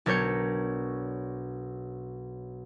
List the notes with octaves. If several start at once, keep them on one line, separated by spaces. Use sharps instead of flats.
B1 D4 A#4 C#5 G6 C#7